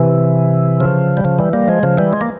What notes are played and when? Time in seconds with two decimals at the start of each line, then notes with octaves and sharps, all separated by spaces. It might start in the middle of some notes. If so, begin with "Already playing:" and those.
Already playing: C3 E3
0.80 C#3 F3
1.17 G3
1.24 C#3 F3
1.39 E3 G3
1.53 G3 A#3
1.68 F3 G#3
1.83 C#3 F3
1.97 E3 G3
2.13 G#3
2.21 A#3